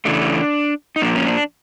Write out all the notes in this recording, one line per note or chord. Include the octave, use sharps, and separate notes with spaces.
C#3 E3 A3 D4
D#4
A#2 F3 A#3 D4
C#4
D4